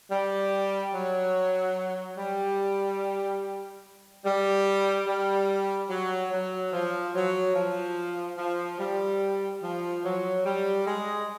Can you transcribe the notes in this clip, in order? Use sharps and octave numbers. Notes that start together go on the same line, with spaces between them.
G3
F#3
G3
G3
G3
F#3
F#3
F3
F#3
F3
F3
G3
F3
F#3
G3
G#3